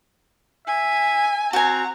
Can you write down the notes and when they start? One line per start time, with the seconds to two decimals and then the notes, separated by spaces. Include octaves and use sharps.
0.67 E5 G#5
1.53 C4 F#4 G#5 A#5